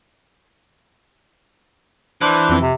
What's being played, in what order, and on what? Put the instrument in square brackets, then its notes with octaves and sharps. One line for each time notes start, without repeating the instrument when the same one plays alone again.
[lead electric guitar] E3 [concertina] D4 C5
[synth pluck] F2 C4
[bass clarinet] C3